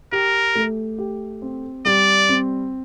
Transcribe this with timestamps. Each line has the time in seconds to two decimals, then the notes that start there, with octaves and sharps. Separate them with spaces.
0.12 G4 A#4
0.55 A3
0.98 G4
1.42 C4
1.85 G3 D5
2.29 C4